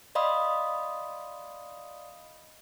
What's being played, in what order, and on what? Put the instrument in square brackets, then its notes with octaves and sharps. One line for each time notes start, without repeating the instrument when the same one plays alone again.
[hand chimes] D5 D#5 F5 B5 C6 D#6